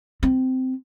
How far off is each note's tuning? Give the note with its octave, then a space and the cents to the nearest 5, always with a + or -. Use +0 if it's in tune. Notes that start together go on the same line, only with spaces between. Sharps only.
C4 -15